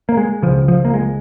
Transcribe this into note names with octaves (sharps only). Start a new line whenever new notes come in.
A#3
G#3
C#2 C#3 F3
F3
A#3
G#3